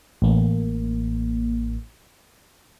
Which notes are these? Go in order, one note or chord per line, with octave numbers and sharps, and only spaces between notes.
A1 A#3